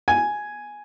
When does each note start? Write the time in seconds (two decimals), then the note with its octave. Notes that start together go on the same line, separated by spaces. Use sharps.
0.08 G#5